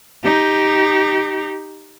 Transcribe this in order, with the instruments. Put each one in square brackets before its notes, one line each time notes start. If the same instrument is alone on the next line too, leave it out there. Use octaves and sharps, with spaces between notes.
[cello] D#4 G4